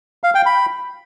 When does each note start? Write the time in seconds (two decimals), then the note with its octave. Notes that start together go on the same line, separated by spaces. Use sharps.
0.24 F5
0.35 G5
0.46 B5